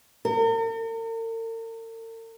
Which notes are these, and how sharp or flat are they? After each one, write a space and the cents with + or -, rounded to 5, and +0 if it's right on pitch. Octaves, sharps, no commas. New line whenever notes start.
A#4 -45